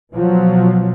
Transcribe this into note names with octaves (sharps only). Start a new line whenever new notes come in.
B2 F3 F#3